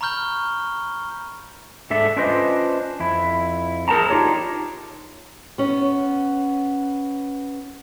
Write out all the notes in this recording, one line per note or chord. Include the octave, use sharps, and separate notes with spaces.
A#5 B5 C#6 F6 G6 G7
G#2 D4 A4 E5
C#4 D4 F4 B4 C5 D#5
F2 E4
G#4 A#4 C5 A5 A#5
D4 D#4 F4 G4 C#5
B3 C#4